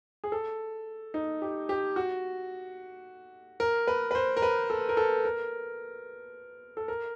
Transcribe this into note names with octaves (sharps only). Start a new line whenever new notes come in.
G#4
A4
D#4
G4
G4
F#4
A#4
B4
B4
C5
A#4
B4
A4
A#4
A4
A#4
A4
A#4